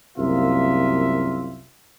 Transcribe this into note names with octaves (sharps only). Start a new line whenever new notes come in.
C2 F#2 A#3 F4 E5